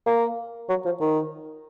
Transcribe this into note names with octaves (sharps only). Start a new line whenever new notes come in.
A#3
F#3
F3
D#3